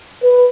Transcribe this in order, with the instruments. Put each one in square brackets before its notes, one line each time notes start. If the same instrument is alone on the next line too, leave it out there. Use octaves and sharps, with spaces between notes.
[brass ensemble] B4